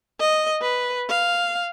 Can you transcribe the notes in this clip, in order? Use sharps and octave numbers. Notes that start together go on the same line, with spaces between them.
D#5
B4
F5